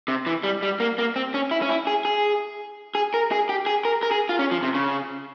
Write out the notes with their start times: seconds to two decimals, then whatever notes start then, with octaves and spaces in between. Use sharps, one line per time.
0.08 C3
0.26 E3
0.44 G3
0.63 G3
0.80 A#3
0.98 A#3
1.16 C4
1.34 C#4
1.51 E4
1.62 C#4
1.69 E4
1.87 G#4
2.05 G#4
2.95 G#4
3.14 A#4
3.32 G#4
3.49 G4
3.66 G#4
3.85 A#4
4.03 A#4
4.11 G#4
4.29 F4
4.39 C#4
4.51 F3
4.63 C3
4.74 C#3